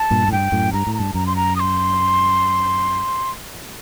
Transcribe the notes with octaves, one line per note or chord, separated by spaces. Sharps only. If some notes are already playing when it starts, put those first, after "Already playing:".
Already playing: A5
G2 A#2
A2
G2 G5
F#2 A2
G2 A#5
A2
A#5
G2 A5
F#2 A#5
C6
A#5
D#6
C6